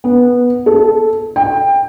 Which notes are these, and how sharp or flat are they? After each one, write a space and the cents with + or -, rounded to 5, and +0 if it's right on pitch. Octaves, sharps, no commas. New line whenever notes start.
B3 -10
A4 -5
G5 +20